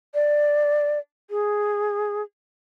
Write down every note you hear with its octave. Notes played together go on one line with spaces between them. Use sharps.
D5
G#4